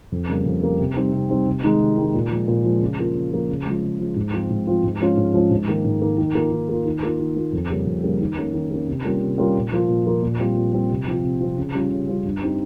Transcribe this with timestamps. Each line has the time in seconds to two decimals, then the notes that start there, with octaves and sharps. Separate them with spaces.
0.12 F2
0.29 C#3 G3 A#3
0.46 F2
0.63 C#3 G3 A#3
0.79 C3
0.96 G3 C4 D#4
1.13 C3
1.30 G3 C4 D#4
1.47 C3
1.64 D#3 G#3 D#4
1.81 C3
1.97 D#3 G#3 D#4
2.14 A#2
2.31 F3 G#3
2.48 A#2
2.65 F3 G#3
2.81 C#3
2.98 F3 A#3 F4
3.15 C#3
3.32 F3 A#3 F4
3.49 C#3
3.66 F3 G#3
3.83 C#3
3.99 F3 G#3
4.16 G#2
4.33 F3 C4 F4
4.50 G#2
4.67 F3 C4 F4
4.84 G#2
5.01 F3 G#3 C#4 F4
5.17 G#2
5.34 F3 G#3 C#4 F4
5.51 G#2
5.68 D#3 A#3
5.84 G#2
6.01 D#3 A#3
6.18 D#3
6.35 A#3 F4
6.52 D#3
6.69 A#3 F4
6.85 D#3
7.03 A#3 F4
7.19 D#3
7.36 A#3 F4
7.53 F2
7.70 C#3 G3 A#3 C#4
7.87 F2
8.04 C#3 G3 A#3 C#4
8.21 D#3
8.37 A#3 C#4
8.54 D#3
8.71 A#3 C#4
8.88 C3
9.04 G3 A#3 C#4 F4
9.22 C3
9.38 G3 A#3 C#4 F4
9.55 A#2
9.72 F3 A#3 F4
9.89 A#2
10.06 F3 A#3 F4
10.23 A#2
10.39 G3 C4 F4
10.56 A#2
10.73 G3 C4 F4
10.90 C3
11.07 F3 C4 F4
11.24 C3
11.40 F3 C4 F4
11.57 C#3
11.74 G3 C#4 F4
11.91 C#3
12.08 G3 C#4 F4
12.25 G2
12.42 G3 C4 D#4